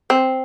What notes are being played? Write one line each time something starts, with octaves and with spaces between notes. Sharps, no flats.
C4